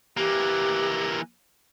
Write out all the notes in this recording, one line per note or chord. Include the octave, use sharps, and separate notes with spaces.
E3 A#3 G4